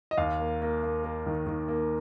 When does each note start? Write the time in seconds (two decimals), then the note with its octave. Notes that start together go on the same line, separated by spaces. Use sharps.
0.11 D#5
0.18 D#2 F5
0.39 A#3
0.62 A#3
0.83 A#3
1.04 A#3
1.26 D#3
1.47 D#3
1.68 A#3